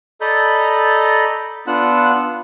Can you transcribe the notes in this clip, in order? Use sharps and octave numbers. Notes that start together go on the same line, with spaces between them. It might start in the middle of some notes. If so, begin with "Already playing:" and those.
A4 D5 D#5 A#5 B5 G6
B3 D4 F4 F#5 E6 F#6